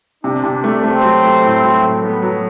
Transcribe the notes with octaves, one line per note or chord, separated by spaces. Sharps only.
C3 D4
C3
A3
A3 C4
F#3
A3
A2
F#3
A2
A3 B3
F#3